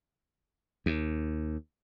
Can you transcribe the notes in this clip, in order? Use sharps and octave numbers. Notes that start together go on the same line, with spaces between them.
D#2